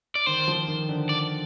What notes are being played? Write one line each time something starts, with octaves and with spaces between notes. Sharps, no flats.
D5
D#3 C5
F3
D#3
D3
D5